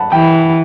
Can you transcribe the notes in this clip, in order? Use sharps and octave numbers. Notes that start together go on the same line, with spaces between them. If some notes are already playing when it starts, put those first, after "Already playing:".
Already playing: F#5 A5 B5
E3 G5 B5